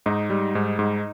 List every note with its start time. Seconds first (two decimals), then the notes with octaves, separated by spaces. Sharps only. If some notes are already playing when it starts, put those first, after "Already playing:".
0.06 G#2 D#4
0.30 G3
0.55 G#2
0.79 G#2